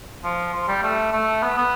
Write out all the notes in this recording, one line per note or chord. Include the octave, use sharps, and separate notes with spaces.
F3
F3
G3
A3
A3
B3
B3